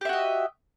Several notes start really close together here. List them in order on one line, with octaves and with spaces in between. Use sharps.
G4 E5 F#4 D#5